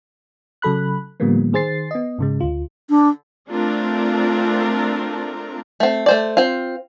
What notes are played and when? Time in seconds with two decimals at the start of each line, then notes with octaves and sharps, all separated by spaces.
0.62 C#3 F#3 A4 B5 F#6
1.20 A2 D3 F3 G3 A#3 B3
1.53 D#3 G#4 C5 A6 C7
1.91 B3 D#5
2.19 G#2 C#3 G#3
2.40 D2 F4
2.90 D4
3.50 A3 C4 D4 F4 A#4
5.80 A3 C4
6.06 A3 C5 D5
6.37 C4 F4